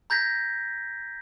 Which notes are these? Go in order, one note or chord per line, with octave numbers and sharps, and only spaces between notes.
A#5 G6 G#6 A#6 B6